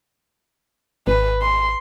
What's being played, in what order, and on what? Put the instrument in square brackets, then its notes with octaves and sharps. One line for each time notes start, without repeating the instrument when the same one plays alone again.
[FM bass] G#1 [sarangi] B4
[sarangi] C6